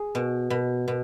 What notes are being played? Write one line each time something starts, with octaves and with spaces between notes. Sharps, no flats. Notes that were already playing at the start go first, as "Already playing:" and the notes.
Already playing: G#4
B2
B2
B2